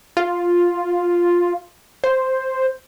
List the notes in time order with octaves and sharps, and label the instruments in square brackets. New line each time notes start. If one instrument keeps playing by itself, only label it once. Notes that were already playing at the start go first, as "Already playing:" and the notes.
[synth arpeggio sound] F4
C5